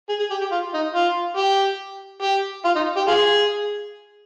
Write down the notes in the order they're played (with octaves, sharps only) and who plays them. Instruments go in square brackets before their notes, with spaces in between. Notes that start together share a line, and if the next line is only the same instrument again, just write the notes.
[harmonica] G#4
G#4
G4
G4
F4
D#4
F4
G4
G4
F4
D#4
G4
F4 G#4